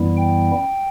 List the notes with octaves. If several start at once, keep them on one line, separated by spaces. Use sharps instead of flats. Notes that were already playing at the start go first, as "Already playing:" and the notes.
Already playing: F#2 E3 G3 B3 E4
G5